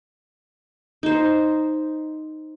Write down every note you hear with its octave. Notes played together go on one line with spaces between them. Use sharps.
D#4 C5